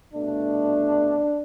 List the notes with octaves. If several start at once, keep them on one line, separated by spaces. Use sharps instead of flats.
C2 B2 A3 D4